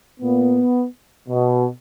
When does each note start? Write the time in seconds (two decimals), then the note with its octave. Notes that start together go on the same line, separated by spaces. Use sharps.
0.20 A#2 B3
1.29 B2